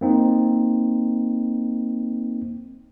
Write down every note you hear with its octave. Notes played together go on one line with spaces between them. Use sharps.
A#3 C4 D#4